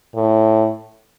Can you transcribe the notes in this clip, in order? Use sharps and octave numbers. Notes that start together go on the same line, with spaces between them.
A2